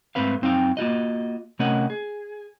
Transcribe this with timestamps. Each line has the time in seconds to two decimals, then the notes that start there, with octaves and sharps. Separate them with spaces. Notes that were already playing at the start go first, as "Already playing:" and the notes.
0.15 G#2 A3 C4 B4 F5
0.42 F#2 C4 D#4 F5 G5
0.77 A#3 F4 F#4 D#5
1.59 C3 A3 C#4 A#4 D#5 F#5
1.90 G#4